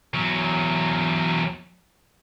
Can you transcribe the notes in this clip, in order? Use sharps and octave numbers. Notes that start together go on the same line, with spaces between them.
E2 F#3